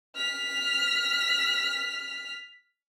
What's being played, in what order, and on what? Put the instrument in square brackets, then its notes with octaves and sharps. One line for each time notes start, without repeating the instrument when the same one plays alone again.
[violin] F6 B6